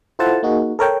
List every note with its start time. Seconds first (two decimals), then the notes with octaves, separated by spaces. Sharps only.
0.19 E4 F4 A4 C5 F#5 A5
0.43 A#3 D#4 F#4 G#4
0.79 A4 A#4 C#5 G5